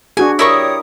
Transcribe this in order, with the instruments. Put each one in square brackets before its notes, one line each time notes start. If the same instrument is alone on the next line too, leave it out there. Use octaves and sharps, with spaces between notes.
[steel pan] D4 F#4 G#4 [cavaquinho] G#5
[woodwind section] G3 C#5 D#6 [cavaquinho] E4 A#4 C#6